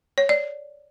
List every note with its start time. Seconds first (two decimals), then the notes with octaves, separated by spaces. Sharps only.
0.18 C#5
0.29 D5